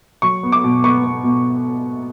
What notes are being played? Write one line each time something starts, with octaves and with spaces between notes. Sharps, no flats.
F#3 C#6
B3
D6
B2
B3 C#6
B3
B2